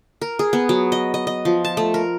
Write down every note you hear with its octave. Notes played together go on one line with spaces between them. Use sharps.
A#4
G#4
B3
F#3
D#5
D#5
D#5
F3
A5
A3
A#4